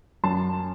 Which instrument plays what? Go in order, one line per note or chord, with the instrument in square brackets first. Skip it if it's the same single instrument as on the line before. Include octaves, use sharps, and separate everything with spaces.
[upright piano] F#2 A5 C6